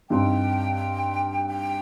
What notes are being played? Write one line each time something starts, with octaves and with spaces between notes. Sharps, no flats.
G2 G3 C4 D#4 G5
G5